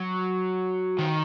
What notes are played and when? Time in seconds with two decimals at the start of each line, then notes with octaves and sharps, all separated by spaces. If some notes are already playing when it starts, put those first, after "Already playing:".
Already playing: F#3
0.98 D#3